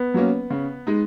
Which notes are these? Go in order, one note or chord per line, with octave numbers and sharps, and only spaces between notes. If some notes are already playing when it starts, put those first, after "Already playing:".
Already playing: B3
F#3 A#3 C#4
C#3
G#3 D#4